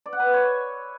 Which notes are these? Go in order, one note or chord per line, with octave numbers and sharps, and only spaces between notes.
D5
F#5
B4
E5
C#5